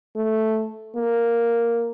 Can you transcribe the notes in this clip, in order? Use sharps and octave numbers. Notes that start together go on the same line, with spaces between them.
A3
A#3